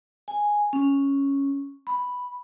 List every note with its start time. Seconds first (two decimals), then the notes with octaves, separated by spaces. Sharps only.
0.28 G#5
0.73 C#4
1.87 B5